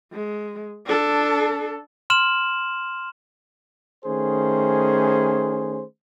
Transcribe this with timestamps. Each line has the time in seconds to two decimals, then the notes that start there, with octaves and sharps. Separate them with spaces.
0.12 G#3
0.86 D4 A4
2.10 C6 F6 E7 F#7
4.05 D#3 A3 C#4 G#4 C5